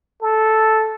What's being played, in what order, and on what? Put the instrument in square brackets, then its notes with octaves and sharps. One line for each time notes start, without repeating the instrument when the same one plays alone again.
[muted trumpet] A4